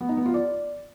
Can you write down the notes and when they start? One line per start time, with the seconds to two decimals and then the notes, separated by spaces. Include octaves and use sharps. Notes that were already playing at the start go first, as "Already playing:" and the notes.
0.01 B3
0.09 D#4
0.17 B3
0.26 F4
0.34 D5